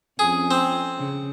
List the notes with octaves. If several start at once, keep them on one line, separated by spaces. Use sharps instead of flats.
F2 C#4 G#4
C4
C#3